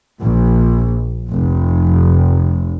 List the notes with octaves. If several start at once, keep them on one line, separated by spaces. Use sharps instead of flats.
A#1
F1